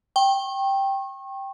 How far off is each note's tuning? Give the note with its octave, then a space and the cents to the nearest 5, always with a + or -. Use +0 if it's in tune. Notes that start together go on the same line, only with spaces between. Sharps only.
G5 +0 C#6 -35